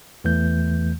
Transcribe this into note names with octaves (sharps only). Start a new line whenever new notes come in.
E2 E3 A3 G6